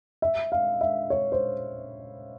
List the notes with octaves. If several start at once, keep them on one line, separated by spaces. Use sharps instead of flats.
E5
F5
E5
C#5
C5